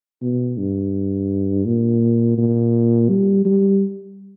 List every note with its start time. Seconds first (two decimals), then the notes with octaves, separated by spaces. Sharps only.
0.22 B2
0.58 G2
1.65 A#2
2.38 A#2
3.09 G3
3.45 G3